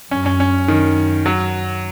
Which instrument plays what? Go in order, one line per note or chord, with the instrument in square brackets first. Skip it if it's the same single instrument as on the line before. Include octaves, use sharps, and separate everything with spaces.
[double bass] F#2 [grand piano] C#4
[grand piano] C#4
C#4
D#3
F#3